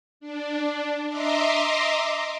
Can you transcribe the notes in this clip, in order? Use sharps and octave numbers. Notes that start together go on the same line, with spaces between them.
D4
D#5 E5 A#5 C6 D6